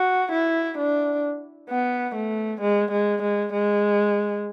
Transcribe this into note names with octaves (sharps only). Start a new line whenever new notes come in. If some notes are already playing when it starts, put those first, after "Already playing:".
Already playing: F#4
E4
D4
B3
A3
G#3
G#3
G#3
G#3